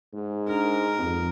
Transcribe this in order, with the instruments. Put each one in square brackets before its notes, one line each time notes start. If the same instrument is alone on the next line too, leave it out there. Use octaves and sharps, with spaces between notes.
[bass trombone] G#2
[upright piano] D4 [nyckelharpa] A#4
[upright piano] F2